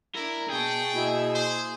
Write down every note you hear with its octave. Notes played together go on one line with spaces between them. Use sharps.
D4 E4 A#4
B2 G#4 G5 A5 C#6
B2 A#3 E4 E5
C5